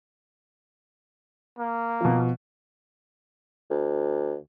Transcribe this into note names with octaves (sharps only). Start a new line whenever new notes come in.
A#3
B2 F3
D2